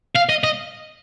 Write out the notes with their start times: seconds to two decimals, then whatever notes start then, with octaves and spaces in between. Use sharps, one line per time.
0.16 F5
0.30 D#5
0.44 D#5